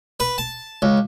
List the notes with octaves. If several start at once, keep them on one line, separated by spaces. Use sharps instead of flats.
B4
A5
C#2